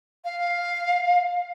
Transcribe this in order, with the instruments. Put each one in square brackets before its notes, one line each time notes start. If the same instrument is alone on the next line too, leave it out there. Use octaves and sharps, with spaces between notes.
[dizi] F5